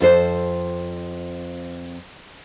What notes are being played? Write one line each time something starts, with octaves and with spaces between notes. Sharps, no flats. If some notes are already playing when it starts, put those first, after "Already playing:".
F2 A4 C5